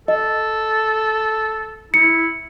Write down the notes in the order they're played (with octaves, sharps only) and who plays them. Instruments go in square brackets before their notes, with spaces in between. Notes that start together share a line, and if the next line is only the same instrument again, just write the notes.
[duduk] A4 [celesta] D#5
[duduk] E4 [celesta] C#7